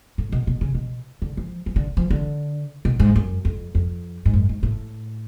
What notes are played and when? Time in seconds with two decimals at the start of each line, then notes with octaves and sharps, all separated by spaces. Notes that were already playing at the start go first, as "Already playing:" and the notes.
0.18 A2
0.32 B2
0.47 B2
0.61 C#3
0.75 B2
1.22 D3
1.37 F3
1.66 F3
1.76 D3
1.97 F3
2.10 D3
2.85 B2
3.00 G#2
3.16 F#2
3.45 F2
3.75 F2
4.25 G#2
4.33 F#2
4.49 G#2
4.63 A2